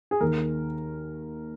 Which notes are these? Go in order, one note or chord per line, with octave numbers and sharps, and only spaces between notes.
G#4
D#2 D#3 A#4